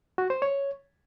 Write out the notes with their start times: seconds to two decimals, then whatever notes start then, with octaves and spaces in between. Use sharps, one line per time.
0.18 F#4
0.30 C5
0.42 C#5